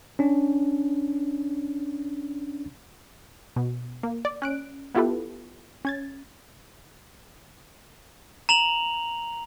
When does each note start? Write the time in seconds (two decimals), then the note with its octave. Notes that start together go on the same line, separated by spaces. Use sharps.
0.19 C#4 D4
3.56 B2
4.03 A#3
4.25 D5
4.42 C#4 F#6 D7
4.95 B3 E4 F4 G4 A4 B4
5.85 C#4 G#6 A6
8.49 A#5 F7 F#7